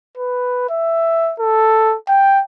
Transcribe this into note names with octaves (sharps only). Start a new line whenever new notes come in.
B4
E5
A4
G5